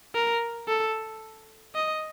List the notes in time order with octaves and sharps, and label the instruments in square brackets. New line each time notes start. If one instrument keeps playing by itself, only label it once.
[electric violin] A#4
A4
D#5